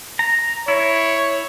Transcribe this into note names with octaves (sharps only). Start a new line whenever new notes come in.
A#5
E4 C#5